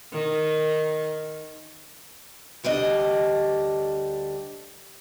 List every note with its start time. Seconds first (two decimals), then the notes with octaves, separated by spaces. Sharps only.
0.12 D#3
2.64 D2 G3 D4 D#5